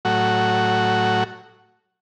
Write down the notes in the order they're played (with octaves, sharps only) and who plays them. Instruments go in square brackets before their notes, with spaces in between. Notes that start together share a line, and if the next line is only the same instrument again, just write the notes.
[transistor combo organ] A2 F#3 F#4